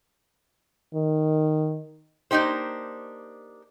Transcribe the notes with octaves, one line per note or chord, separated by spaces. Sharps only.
D#3
A#3 D4 D#4 G4 C5